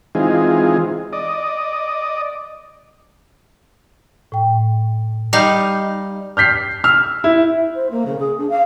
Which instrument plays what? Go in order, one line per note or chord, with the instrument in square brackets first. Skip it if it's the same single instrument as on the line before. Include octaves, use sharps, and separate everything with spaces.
[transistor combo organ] E3 G#3 C4 D#4 F4 G#4
D5 D#5
[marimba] A2 G5
[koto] G3 D#4 F5
[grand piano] F6 G6 B6 C7
E6 F6
E4
[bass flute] C5
A#3
C#3
G#4
D4
F5